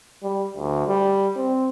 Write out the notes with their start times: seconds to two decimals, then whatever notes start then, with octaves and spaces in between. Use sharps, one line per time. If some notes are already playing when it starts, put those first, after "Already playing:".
0.23 G3
0.57 D2
0.87 G3
1.36 C4